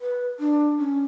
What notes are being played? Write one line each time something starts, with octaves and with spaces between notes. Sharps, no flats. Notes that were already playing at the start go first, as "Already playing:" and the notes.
B4
D4
C#4